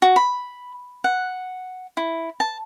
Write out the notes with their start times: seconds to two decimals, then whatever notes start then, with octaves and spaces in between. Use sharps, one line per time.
0.02 F#4
0.16 B5
1.04 F#5
1.97 E4
2.40 A5